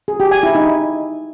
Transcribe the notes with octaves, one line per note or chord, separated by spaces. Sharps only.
G#4
G4
G#5
E4
D#4